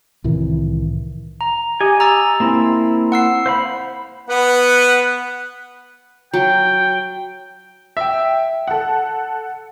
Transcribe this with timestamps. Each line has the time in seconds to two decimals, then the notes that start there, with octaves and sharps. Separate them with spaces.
0.24 C2 A2 D#3 E3
1.41 A#5
1.81 G4 D#5 G#5
2.00 A#5 E6 A6
2.40 A#3 C4 E4
3.12 F#5 E6 C7
3.46 C5 F5 B5
4.29 B3 B4 F#5
6.33 F#3 G5
7.97 E5 G5
8.67 A4 F#5